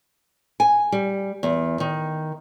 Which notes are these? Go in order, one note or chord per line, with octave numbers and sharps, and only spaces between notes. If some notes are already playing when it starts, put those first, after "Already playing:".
G#5
G3
E2
D#3